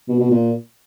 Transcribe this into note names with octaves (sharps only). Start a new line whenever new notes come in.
B2
B2
A#2